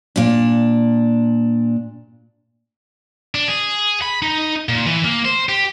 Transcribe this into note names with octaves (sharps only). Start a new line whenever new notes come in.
A#2 D4
D4
G#4
B5
D#4
A#2
E3
A#3
C5
G4